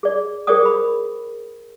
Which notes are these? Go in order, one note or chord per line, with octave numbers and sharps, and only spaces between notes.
G#4 D5
G#4 A#4 C5 D5 G5 D#6
B5